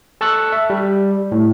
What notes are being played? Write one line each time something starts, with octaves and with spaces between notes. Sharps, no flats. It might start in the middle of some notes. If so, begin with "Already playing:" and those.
A4 A5 C#6 E6 F#6
E5
G3
A2